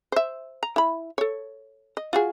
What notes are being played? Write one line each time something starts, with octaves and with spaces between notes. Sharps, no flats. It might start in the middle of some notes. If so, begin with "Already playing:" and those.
C5 E5
A#5
E4 B5
A4 C#5
D#5
F4 F#4 G#4